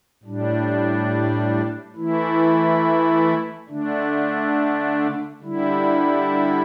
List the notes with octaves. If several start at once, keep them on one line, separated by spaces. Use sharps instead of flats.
A2 G3 D4
E3 A3 E4
D3 A3 D4
D3 G3 E4